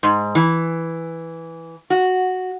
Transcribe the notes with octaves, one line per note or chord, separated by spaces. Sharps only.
G#2
E3
F#4